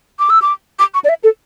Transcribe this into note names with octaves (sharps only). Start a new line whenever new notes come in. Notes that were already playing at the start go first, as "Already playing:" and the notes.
D6
E6
D6
D6
C#6
D5
E5
A4